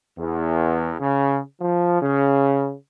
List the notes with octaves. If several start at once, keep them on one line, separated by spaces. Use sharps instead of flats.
E2
C#3
F3
C#3